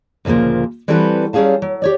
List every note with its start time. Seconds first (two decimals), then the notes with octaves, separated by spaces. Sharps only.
0.25 D2 A#2 C#3 F3 A#3
0.88 E3 G3 C4 F#4 A4 B4
1.33 F#3 G3 C#4 G#4 F5 A5
1.62 F#3
1.82 G4 C#5 D5